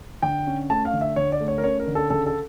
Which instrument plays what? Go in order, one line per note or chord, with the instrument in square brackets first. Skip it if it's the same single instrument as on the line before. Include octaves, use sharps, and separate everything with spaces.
[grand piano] D3 G5
C#4
A3 A5
F5
D3
E5
D3 C#5
D5
A3
C#5
A#4
C#4 C#5
A#4
D3
A4
C#3 A4
A4